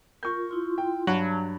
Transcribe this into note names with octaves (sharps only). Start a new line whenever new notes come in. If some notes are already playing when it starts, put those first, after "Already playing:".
F4 A#4 C#6 G6
E4 F4 C6
G5
G2 F#3 A5 F#7